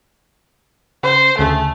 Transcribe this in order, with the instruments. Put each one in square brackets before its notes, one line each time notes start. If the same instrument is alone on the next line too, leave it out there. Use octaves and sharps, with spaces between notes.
[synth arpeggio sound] C#3 [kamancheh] C5
[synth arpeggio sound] D2 C#3 G#4 [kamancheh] A3